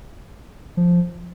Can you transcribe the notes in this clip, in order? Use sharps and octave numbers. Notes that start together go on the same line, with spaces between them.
F3